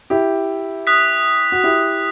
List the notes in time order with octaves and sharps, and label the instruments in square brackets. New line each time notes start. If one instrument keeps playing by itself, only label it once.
[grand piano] E4 G4
[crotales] D#6 F#6 B6
[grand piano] F#4
E4 G4